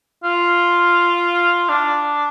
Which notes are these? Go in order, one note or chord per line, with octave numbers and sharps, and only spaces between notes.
F4
D4